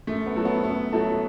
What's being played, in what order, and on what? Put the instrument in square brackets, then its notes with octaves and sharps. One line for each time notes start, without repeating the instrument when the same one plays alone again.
[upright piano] F#2 [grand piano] A3
[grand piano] B3
[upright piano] F#3 A3 E4 A4
[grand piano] B3
[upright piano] F#2 [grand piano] B3
[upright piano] F#3 A3 E4 A4